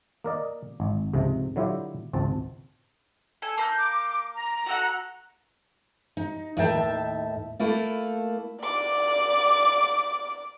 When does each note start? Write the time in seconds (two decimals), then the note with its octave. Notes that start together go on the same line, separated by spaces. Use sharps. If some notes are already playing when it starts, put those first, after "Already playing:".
0.24 A#3 A#4 D5 D#5
0.80 G#1
1.13 C#2 G#2 C3 F3
1.56 D3 F#3 E4 F4 G4
2.13 G#1 C#2 C4 A5
3.42 A4 G#5
3.58 A#3 B5 G6
3.77 D6
4.35 A#5
4.66 F#4 A4 F#5
6.17 D#4
6.57 D#2 A2 D#3 E5 G5 A5
7.59 A3 A#3 E4 F4
8.61 D5 D6